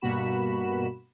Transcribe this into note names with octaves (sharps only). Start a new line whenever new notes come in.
G2 B2 A#3 F#4 B5 E7